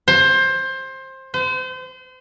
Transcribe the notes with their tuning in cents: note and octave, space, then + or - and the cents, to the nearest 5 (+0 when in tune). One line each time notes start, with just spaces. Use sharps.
C5 +20
C5 -35